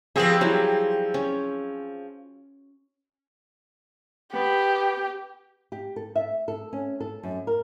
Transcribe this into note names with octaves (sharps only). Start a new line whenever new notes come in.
F3 C4 G4 G#4 B4 D5
F#3 G3 E4
C#4
B3 G4 B4
G4
A4
E5
A4
C#4
A4
F#2
A#4